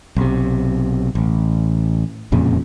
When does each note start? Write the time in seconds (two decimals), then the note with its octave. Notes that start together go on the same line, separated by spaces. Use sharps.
0.17 B1 C3
1.15 A1
2.32 E1 F2 A#2 C#3